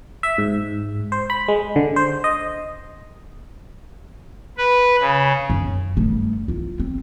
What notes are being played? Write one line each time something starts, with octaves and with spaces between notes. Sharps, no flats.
E5
G#2
C5
B5
G#3
D3
C5
D#5
B4
C#3
F#2
G2 A3
E4 F4
C4